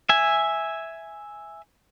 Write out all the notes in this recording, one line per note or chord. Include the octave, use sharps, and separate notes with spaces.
E5 G#5